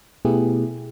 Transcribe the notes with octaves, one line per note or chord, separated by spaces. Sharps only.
B2 A3 B3 E4 G4 G#4